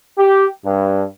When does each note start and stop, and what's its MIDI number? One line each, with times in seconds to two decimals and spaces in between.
0.18 0.46 67
0.64 1.03 43